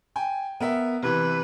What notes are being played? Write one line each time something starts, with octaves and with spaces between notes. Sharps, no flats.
G5 G#5
B3 A#4 E5
C3 E3 B4